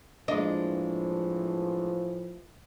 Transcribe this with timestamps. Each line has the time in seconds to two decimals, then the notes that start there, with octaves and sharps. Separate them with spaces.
0.28 A2 E3 F3 G#3 A#3 D4 D#5